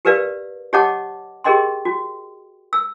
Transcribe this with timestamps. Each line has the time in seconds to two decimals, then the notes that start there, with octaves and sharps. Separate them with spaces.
0.05 G4 A#4 B4 D5 F5
0.73 G4 C#5 D#5 F#5 A5 D6
1.44 G4 G#4 A#4 D#5 G5 C6
1.85 F#4
2.73 E6